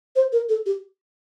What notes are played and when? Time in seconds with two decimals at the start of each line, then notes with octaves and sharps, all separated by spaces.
0.16 C5
0.32 A#4
0.49 A4
0.66 G4